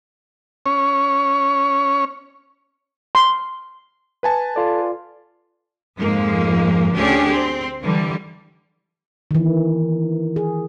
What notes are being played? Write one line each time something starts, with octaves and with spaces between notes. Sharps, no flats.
C#4 C#5
C6
B4 G#5 A5
F4 A4 D5
F2 G#2 F3 G#3 A#3
D2 D3 C#4 D4 G4 G#4
C4
D3 E3 G3
D#3 E3
G#4